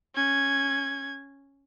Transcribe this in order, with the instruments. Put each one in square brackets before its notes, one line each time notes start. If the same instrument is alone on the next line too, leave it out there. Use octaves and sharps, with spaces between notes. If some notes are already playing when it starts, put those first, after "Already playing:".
[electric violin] C#4 G#6